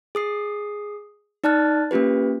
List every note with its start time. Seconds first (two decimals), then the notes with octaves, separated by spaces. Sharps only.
0.15 G#4 D#6 C7
1.44 D#4 D5 A5 F6 F#6 A6
1.91 A#3 C#4 F4 G4 B4